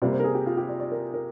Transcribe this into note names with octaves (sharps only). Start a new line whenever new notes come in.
C3 G3 A#3 D5
C5
A#4
G#4
G4
F4
G4
D5
D5
A#4
A#4